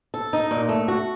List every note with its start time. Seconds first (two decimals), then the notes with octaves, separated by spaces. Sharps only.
0.14 A4
0.33 D#4
0.51 A#2
0.69 A3
0.88 F#4